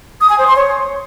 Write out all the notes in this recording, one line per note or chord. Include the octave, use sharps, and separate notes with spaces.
D#6
G#5
C5
C6
C#5